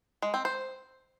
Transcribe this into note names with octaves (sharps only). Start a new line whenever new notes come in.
G#3
C4
C5